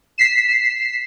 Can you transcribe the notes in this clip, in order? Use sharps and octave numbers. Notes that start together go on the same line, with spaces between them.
B6 C7 E7